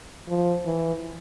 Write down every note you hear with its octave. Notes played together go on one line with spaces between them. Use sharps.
F3
E3